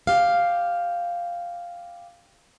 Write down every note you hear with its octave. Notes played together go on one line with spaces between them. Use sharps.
G4 F5